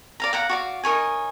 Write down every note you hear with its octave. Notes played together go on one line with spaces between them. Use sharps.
D5 F5 A#5
F5 F#5 A#5
F#4 D5 F5
D#4 A#4 C#5 G#5